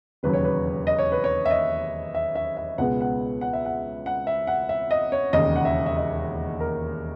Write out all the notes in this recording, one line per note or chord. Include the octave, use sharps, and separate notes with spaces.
E1 D#2 C#3 F#3 B4
C#5
B4
D#5
C#5
B4
C#5
E5
D#5
E5
E5
E5
C#2 B2 G#3 B3 F#5
F#5
F#5
E5
F#5
F#5
E5
F#5
E5
D#5
C#5
E1 D#2 C#3 D#5
F#5
E5
E5
D#5
A#4